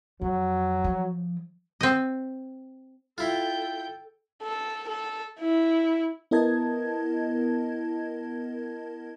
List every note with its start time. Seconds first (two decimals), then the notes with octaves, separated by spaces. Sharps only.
0.21 F2 F#3
0.84 F3
1.81 C4 D#5
3.18 E4 F4 A4 G5 G6
4.43 A4
4.88 A4
5.39 E4
6.31 B3 E4 A#4 D#5 A5 G#6